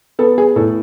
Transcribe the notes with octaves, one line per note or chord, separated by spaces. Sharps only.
B3 A4
G#4
A2 A4